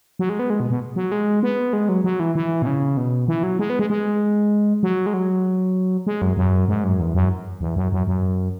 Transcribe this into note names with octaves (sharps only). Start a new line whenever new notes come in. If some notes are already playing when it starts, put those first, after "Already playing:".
F#3
G#3
B3
G#3
B2
B2
F#3
G#3
B3
G#3
F#3
F#3
E3
E3
B2
C#3
B2
E3
F#3
G#3
B3
G#3
G#3
F#3
G#3
F#3
G#3
F#2
F#2
G#2
F#2
E2
F#2
E2
F#2
F#2
F#2